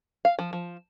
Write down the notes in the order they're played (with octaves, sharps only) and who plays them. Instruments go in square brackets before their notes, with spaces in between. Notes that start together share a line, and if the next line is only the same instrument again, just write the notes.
[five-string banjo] F5
F3
F3